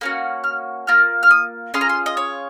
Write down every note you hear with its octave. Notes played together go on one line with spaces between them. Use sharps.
A#3 C#4 F#4
F6
A#3 F4 F6
F6
D#6
C#4 F4 G#4 C6
A#5
C6
D#5
C#5